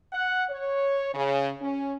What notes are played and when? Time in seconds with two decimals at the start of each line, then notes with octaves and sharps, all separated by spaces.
0.13 F#5
0.50 C#5
1.14 C#3
1.61 C#4